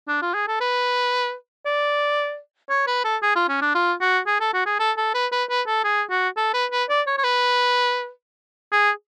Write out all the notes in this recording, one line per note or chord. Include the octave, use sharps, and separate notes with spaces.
D4
F4
G#4
A4
B4
D5
C#5
B4
A4
G#4
F4
C#4
D4
F4
F#4
G#4
A4
F#4
G#4
A4
A4
B4
B4
B4
A4
G#4
F#4
A4
B4
B4
D5
C#5
C#5
B4
G#4